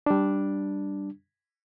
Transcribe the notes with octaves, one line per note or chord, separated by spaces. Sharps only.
G3 D4